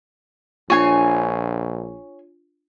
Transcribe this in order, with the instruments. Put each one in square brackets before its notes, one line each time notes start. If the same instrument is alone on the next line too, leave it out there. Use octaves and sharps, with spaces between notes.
[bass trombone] A#1 [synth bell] D4 F4 [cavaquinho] C#5 G#5